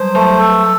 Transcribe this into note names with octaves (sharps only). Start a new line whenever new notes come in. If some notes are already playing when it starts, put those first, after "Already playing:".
Already playing: F#3 G3 C5
F#3 A3
A4